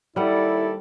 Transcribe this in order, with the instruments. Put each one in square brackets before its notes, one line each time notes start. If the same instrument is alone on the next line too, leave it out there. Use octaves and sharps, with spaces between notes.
[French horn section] D#2 A4 D5 [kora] G3 F#5 [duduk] E4